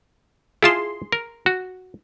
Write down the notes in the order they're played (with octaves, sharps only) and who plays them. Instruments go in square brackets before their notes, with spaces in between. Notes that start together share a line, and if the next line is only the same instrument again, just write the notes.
[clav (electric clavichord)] E4 F4 A5 [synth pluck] G#4 C6
[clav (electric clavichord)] A#4
F#4